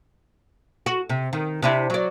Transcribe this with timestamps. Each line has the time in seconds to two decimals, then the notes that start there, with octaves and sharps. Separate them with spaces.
0.86 F#4
1.09 C3
1.33 D#3
1.62 C3 D4 E4
1.90 F#3 D5